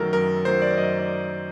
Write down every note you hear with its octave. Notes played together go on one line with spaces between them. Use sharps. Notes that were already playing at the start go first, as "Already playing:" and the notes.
Already playing: F#2 D#3 F#3 A3 A4 A#4
F#2 A#4
D#3 F#3 A3 C5
D5
F#2 D#5
D5